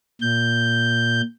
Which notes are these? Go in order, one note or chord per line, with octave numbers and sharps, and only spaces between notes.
A#2 G6